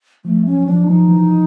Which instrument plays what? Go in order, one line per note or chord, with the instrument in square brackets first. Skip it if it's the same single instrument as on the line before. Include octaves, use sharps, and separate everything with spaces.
[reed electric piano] F3 [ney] A3
[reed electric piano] F#3 [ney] C#4
[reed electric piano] F3 [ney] D4
[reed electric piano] F3 [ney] D#4
[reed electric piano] E3